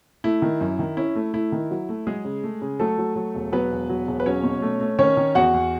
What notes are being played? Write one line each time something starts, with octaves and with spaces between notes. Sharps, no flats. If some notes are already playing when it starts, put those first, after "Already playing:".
A3 E4
D#3
F#2
D#3
C#4 E4
A3
A3 E4
D#3
F#3
A3
F#3 G#3 G#4
C#3
A3
C#3
F#3 A3 A4
F#3
F#3
E1
F#3 B3 B4
E1
F#3
E1
B4
F#3 C#4 C#5
B2
A3
A3
D#3 C#4 C#5
D#3
E2 F#4 F#5
E2